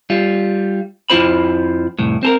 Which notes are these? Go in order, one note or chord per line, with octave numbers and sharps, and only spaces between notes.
G3 F4
F2 E4 F4 C5 B5
C2 F2 A2
C4 A4 A#4